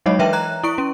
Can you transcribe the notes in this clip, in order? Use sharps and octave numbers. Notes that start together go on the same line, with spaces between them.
F#3 G#3 D#4 C#5 D#5
E3 B4 E5 G5
A#5 F#6
E4 C#6 D7
C#4